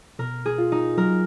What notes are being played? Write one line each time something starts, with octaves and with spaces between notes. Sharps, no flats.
B2 A#4
G#4
F4
D#4
F#3 A#4